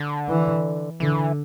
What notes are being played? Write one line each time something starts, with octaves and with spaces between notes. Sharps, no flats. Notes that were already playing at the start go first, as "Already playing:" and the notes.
Already playing: D3
E3
D3 E3